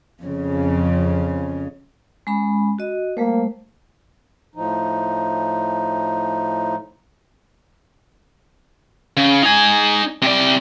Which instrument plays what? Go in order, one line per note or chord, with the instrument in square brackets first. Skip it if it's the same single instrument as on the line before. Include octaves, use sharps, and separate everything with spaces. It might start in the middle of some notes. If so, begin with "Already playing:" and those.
[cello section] F2 C#3
[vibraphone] G#3 C#4 B5
F#4 D#5
[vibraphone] G3 A3 C5 [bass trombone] A#3
[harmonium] A2 F3 D#4
[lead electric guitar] C#3
D#4 G#5
C3 D5